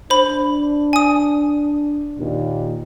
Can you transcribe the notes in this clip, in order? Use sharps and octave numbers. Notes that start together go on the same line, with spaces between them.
D4 C5 B5
G#5 D#6
D#2 A#2